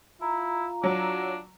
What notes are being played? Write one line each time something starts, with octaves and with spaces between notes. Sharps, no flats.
E4 F4 A#5
F#3 D4